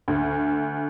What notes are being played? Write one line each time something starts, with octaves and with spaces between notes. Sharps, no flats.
D2